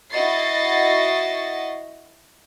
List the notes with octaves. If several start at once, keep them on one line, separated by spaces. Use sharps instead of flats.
E4 F#4 D#5 C#6 A6 C7